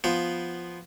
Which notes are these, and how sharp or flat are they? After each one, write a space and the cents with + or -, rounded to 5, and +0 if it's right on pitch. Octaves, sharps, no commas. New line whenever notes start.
F3 +0 B3 +0 C5 +0